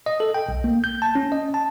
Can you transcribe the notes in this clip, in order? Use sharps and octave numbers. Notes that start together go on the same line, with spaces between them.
D#5
A4
G5
B1
A#3
G6
A5
C#4
D#5
A5